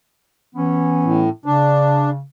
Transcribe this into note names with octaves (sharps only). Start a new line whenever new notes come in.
E3 B3 C#4
A2
C#3 D4